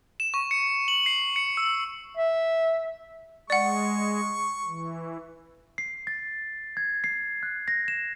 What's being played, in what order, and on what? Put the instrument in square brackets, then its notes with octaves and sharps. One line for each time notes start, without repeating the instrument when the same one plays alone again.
[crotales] E7
C#6
C#7
F#7
C7
C#7
E6
[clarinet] E5
[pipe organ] G#3 [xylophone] D5 F#5 [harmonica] C#6
[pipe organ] E3
[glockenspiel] C7
A6
G#6
C7
F#6
A#6
E7